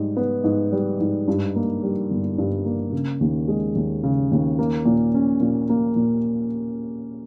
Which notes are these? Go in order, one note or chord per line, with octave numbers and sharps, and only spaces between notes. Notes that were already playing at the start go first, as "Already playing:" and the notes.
Already playing: G#2 G3
B3
G#2
G3
G#2
G2
A#3
G3
G1
G2
A#3
C#3
D#2
G#3
D#2
C#3
D#2
A#3
A#2
C#4
A#2
A#3
A#2